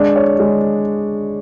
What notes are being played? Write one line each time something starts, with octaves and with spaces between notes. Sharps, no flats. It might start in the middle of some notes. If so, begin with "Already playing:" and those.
Already playing: G#3 D4
C#5
G#3